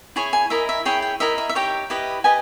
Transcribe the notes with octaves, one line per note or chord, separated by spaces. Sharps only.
E4 G#4 C#5 G#5
G#5
E4 A#4 D#5 E5
E5
E4 G#4 C#5 G5
G5
E4 A#4 D#5 E5
E5
E5
D#4 G4 C#5 G5
E4 G4 B4 D#5
G4 B4 D#5 G#5